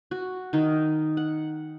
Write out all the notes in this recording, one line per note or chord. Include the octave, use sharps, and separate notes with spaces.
F#4
D#3 D#4
F#5